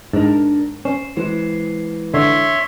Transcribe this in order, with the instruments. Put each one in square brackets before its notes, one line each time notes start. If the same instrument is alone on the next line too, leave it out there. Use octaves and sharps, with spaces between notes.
[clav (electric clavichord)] G#2 [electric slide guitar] D4 A#4
[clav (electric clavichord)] C#4 [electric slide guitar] C5
[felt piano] E3 [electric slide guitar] G#3 C5
[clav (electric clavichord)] D3 [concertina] C#5 E5 C6